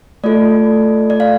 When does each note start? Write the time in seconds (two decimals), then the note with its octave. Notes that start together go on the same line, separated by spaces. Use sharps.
0.24 A3 F4 A4 D5
1.10 D5
1.20 F5